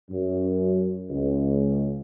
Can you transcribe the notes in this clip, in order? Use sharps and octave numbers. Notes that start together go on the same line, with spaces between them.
F#2
C#2